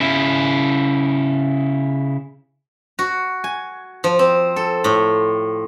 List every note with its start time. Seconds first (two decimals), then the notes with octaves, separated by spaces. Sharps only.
0.01 C#3 E4
2.99 F#4
3.44 G#5
4.04 F3
4.19 C4
4.56 A4
4.84 A2